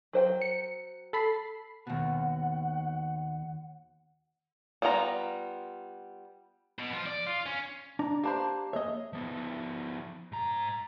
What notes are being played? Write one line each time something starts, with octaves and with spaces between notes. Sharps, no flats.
F#3 C5 G5
C#7
A4 B5 C7
D#2 B2 F#5
G3 B3 F4 F#5 A#5
B2
F3
D5
F4
C#4
D4 A#5
A#3 D4 G4 C5 A#5 B5
A#3 G#4 C#5 D#5 E5
F3 B3
G#2 A#5